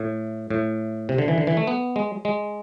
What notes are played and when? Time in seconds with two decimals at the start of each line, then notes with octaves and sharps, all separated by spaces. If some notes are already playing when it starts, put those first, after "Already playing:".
Already playing: A2
0.50 A2
1.09 C3
1.18 D3
1.28 E3
1.38 D3
1.47 E3
1.57 A3
1.67 B3
1.96 G#3
2.25 G#3